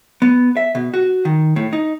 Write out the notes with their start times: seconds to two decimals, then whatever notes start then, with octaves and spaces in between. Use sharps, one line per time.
0.22 B3
0.57 E5
0.75 B2
0.94 F#4
1.25 D#3
1.56 A2
1.73 D#4